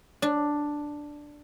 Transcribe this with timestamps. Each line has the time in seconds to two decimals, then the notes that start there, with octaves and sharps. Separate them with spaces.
0.22 D4